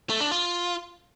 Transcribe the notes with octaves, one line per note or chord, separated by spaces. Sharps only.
A3
D4
F4